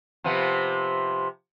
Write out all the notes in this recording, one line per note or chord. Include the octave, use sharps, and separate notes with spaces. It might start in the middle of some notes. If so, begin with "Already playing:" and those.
C3 F3 B3